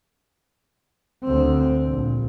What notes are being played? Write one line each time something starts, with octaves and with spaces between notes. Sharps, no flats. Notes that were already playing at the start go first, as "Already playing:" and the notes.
D2 C4
A#1